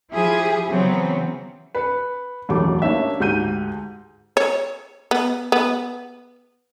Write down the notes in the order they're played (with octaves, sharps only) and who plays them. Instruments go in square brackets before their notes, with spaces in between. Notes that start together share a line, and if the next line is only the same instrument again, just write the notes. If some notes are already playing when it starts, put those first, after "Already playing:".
[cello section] F3 E4 G4 G#4
C#3 E3 F#3 B3 C4
[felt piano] B4 C#7
E1 A1 F#2 A3 D6
A#3 C#4 D4 G4 E5
D2 G#2 G4 G6 D#7
[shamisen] C#5
B3
B3